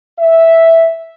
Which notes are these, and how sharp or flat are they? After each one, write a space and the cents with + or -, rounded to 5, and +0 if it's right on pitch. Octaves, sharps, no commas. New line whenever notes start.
E5 -5